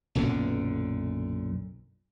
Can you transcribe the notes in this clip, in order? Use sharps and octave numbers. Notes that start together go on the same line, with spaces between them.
B1 F#2 A#2 D3